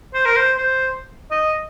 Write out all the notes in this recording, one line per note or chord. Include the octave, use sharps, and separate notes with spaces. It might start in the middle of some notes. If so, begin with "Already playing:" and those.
C5
A#4
C5
C5
D#5